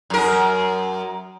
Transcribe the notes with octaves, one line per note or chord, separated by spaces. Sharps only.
F#2 A#4